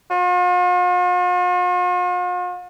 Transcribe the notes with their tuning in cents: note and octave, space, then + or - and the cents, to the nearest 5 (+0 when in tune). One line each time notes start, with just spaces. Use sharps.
F4 +45